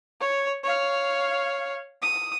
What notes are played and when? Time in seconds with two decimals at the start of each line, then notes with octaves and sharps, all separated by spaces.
0.20 C#5
0.63 C#5 F5
2.02 D#6